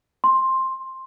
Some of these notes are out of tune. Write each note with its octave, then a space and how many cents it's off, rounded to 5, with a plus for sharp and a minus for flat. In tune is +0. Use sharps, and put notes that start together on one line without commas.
C6 +10